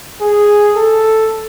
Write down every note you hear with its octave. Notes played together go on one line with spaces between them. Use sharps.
G#4
A4